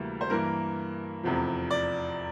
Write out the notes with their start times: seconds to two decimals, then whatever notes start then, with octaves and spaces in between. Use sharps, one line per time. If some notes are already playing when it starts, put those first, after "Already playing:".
Already playing: D2 C3 E3 G3 A#3
0.21 C5
0.30 G2 E3 A#3 A#4
1.23 F1 E2 C3 F3
1.71 D5